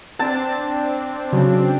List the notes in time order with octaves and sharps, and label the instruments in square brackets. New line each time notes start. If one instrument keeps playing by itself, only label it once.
[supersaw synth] C4 D4 [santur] A5
[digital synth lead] C#3 [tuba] F#3